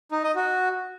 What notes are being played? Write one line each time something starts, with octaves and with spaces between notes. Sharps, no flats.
D#4
D#5
F#4